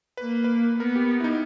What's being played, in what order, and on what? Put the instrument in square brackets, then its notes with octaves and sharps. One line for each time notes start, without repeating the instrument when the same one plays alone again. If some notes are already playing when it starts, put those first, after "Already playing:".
[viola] A#3 [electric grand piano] B4
[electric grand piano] B4
[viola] B3 [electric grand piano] A#4
[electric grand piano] G4
E4
D#4